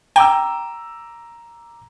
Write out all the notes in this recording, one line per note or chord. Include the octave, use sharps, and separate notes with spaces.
G5 A#5 D6 E6